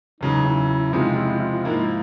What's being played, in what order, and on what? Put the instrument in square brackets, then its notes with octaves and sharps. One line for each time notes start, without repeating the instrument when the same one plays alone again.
[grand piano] E2 C#3 F#3 [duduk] D#4
[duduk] E4
E4
[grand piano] C3 F3 G#3 C4 D#4 [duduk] F4
[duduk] F4
E4
F4
[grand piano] G#2 F3 A#3 [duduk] E4